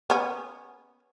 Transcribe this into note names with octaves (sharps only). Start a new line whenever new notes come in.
B3 C#4